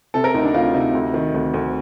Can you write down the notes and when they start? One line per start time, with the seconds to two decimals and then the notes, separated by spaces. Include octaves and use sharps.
0.14 C3 A4
0.24 A#4
0.34 D2 D#4
0.45 D4
0.54 D2 F4
0.74 C3 D#4
0.95 D2
1.14 D#3
1.34 D2
1.54 D2